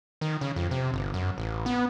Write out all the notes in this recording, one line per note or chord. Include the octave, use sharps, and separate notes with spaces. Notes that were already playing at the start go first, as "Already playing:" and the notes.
D#3
C#3
F2
C3
G1
F#2
A1
B3